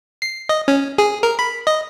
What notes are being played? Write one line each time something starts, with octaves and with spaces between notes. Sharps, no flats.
C7
D#5
C#4
G#4
A#4
B5
D#5